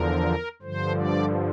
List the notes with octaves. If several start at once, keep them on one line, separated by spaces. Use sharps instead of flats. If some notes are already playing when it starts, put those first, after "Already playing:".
Already playing: E2 D3 F3 A#4
G2 D3 F3 C5
D5